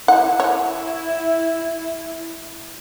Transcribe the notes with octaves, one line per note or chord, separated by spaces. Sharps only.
E4 F#5
C#5